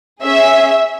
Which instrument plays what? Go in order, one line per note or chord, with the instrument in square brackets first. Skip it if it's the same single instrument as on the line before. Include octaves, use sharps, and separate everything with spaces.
[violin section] C#4 G#4 E5